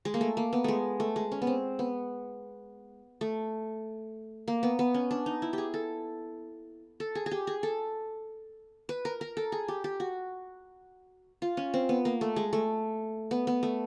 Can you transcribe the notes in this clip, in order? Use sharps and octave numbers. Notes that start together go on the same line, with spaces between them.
G#3
A#3
A3
A#3
B3
G#3 A3
A3
G#3
C#4
B3
C4
B3
A3
A#3
B3
B3
C#4
D4
D#4
E4
G4 G#4
A4
A4
G#4
G#4
G4
G#4
A4
B4
A#4
A#4
A4
G#4
G4
G4
F#4
F4
C#4
C4
B3
A#3
A3
G#3
A3
B3
B3
A3